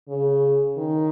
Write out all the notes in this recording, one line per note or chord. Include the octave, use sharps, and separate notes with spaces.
C#3
D#3